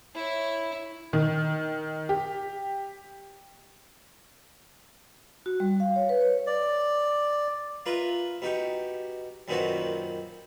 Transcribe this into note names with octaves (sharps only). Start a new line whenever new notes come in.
E4 C#5
D#3
G4
F#4
G3
F5
C#5
B4
C#5
D5
F4 A#4 B4 E5
B2 D#4 G4 C#6
F#2 A#2 D#3 B3 C4 F#4